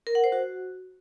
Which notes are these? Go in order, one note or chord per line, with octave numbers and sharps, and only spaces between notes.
A#4
F#5
C5
F#4